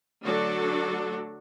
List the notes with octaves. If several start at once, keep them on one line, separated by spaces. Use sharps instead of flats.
D3 F#3 A3 D4 F#4 A4